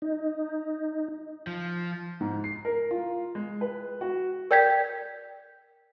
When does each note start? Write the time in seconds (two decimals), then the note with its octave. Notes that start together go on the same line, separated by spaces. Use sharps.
0.02 D#4
1.47 F3
2.21 G#2
2.44 C7
2.65 A#4
2.91 F4
3.35 G#3
3.61 B4
4.01 F#4
4.51 A#4 D5 G5 G6 G#6 B6